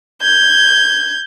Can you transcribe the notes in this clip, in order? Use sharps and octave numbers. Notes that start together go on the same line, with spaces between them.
G6 G#6